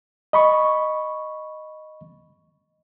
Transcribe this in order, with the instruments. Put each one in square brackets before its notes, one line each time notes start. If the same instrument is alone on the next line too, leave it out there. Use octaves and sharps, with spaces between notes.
[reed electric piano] D#5 B5 C#6